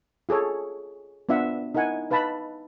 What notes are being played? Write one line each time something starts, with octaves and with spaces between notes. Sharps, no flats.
F4 G#4 A4 C#5
B3 D4 F4 E5 F#5
D#4 E4 A#4 F#5 G#5
D#4 B4 F5 A5 B5